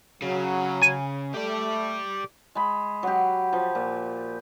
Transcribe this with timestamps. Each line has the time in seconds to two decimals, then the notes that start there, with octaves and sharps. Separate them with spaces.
0.22 C#3 F#3
0.82 G#5
1.34 A3 G4 D5
2.55 G#3 B5
3.03 F#3 G4
3.53 F3
3.75 A#2